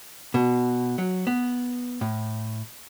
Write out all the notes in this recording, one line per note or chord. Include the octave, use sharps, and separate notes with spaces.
B2
F#3
B3
A2